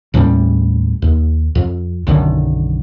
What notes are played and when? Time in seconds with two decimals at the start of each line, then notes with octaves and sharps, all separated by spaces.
0.14 D#2 A2 G3 C#4
1.02 D#2
1.55 F2
2.07 B1 F#2 D3 D#3